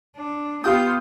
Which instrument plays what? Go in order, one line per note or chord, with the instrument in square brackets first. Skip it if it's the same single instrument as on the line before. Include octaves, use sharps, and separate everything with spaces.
[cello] D4
[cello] B3 [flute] F4 [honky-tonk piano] G4 D#6 [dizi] G6